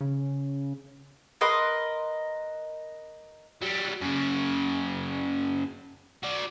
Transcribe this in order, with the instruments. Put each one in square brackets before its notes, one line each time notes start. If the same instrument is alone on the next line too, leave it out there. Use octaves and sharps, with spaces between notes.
[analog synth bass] C#3
[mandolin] A#4 B4 D#5 C6
[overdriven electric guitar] F#3 G3
F#2 C#3
F#4 D5